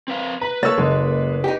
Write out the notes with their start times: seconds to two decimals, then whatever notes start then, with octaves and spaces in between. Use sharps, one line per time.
0.08 C4 B4 F5
0.41 B4 A#5
0.63 A#3 A4 C#5 E6 A6
0.78 F#1 G#3
1.44 D#4 G4